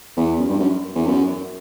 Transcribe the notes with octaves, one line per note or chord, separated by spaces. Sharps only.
E2
F#2
G2
F#2
E2
F#2